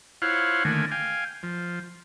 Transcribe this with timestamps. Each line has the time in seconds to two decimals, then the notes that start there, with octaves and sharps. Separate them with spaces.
0.22 E4 F4 C5 C#5 F5 F#5
0.65 D3 D#3 A3 A#3 G#5
0.91 F5 G5 G#5
1.43 F3